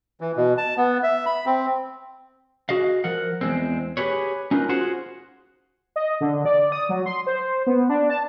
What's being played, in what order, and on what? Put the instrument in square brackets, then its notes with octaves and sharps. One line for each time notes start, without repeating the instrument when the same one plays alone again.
[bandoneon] E3
B2
A5
B3
E5
B5
C4
[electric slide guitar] F#4 G#4 D#5 F5
F3 A#4 F#5
E2 G#3 C4
G4 G#4 B4 C#5
C#4 D#4 F4 A#4 B4
F4 F#4 G#4 C5 F#5
[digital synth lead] D#5
D3
D5
D#6
F#3
C6
C5
B3
D4
A5